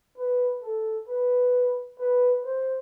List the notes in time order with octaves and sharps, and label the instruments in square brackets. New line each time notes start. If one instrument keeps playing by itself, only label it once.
[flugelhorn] B4
A4
B4
B4
C5